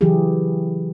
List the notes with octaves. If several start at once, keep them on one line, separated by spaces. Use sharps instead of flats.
C#3 E3 F#3 E4 G4 G#4